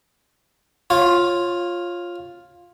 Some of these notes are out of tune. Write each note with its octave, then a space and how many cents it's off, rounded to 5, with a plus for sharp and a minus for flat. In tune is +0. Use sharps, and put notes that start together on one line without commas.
F4 +5 C#5 -20